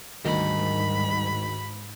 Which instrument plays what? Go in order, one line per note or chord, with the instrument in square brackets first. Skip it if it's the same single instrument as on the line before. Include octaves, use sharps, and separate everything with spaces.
[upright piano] D2 D#3 [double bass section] G#2 [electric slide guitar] G3 A#4 [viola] B5